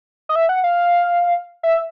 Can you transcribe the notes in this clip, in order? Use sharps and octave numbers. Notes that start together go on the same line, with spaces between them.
D#5
E5
F#5
F5
E5